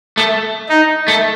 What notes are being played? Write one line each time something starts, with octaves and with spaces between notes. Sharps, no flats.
A3
D#4
A3